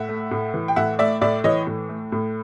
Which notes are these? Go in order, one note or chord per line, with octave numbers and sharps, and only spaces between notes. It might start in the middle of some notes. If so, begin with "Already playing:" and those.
Already playing: A2 E5 F#5
A3
A2
E3
G5
A2 E5 F#5
A3 D5 E5
A2 D5 E5
E3 C#5 D#5
A2
A3
A2